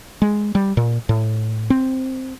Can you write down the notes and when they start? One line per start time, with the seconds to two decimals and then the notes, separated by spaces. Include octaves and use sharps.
0.22 G#3
0.55 G3
0.77 A#2
1.09 A2
1.70 C4